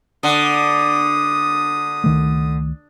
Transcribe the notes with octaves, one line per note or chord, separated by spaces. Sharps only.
D3 D#6
C#2 D#3 A3